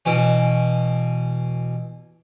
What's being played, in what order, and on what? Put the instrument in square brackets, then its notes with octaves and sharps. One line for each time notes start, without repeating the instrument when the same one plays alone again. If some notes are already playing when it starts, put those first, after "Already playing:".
[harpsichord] B2 E3 C#4